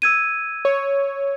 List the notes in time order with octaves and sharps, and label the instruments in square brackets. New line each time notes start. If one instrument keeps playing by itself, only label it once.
[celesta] E6 G#6 D#7
[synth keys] C#5